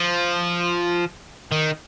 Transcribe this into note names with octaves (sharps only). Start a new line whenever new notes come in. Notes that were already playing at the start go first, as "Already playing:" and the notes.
Already playing: F3
D#3